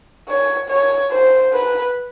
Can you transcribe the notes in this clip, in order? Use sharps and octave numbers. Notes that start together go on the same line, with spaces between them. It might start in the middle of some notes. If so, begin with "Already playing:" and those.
C#5
C#5
C5
B4